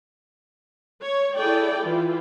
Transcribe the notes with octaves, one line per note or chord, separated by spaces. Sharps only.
C#5
E4 G#4 A4 D5 G5
E3 E4 F4